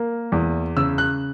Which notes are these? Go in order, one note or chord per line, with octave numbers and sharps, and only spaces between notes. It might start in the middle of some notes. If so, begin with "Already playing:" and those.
Already playing: A#3
E2
C#3 E6
F#6